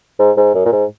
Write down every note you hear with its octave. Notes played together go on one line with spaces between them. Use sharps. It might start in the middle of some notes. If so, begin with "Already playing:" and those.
G#2
G#2
F#2
A#2
G#2